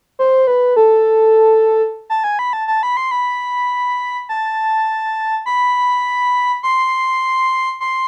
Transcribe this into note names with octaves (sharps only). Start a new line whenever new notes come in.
C5
B4
A4
A5
G#5
B5
A5
A5
B5
C6
B5
A5
B5
C6
C6